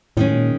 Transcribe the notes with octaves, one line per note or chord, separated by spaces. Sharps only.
A2 D#3 G#3 C#4
A#2